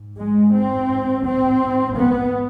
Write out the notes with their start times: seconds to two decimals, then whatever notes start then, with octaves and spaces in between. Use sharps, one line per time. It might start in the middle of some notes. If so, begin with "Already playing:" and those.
Already playing: G#2
0.18 G#3
0.53 C4
1.24 C4
1.95 B3